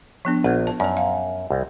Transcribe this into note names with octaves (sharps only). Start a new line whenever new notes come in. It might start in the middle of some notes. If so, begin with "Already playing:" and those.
F3 B3 D4
A#1 F#5
A5
F#2 D5 A5
F5
C2